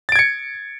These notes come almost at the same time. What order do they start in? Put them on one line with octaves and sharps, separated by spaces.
A6 D7 G#6 C#7